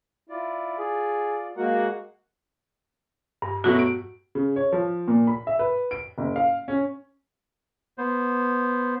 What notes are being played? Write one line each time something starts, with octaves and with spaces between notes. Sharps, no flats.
E4 F4 D5
G#4
G#3 A#3 F#4 A#4 F#5
G2
B2 F#3 A3 F#4
D7
C#3
C#5
F3
A#2
B5
E5
B4
D7
F#1
F5
C#4
B3 C5